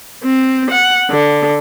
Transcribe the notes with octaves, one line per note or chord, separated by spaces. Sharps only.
C4
F#5
D3